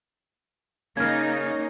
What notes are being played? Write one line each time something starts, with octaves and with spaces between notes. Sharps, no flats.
C#3 A#3 D#4 F6 G#6